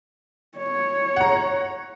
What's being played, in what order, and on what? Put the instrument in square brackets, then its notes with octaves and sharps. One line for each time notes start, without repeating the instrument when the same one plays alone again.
[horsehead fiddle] C#5
[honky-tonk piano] F#5 A#5